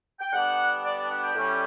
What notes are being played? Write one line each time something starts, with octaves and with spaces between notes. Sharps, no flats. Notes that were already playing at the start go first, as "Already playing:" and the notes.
G5
D3 G3 B3 D4 F#5
D5
D5
F#5
G5
A2 G3 C#4